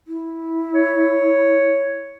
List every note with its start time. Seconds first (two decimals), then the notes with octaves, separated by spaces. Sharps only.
0.07 E4
0.75 C#5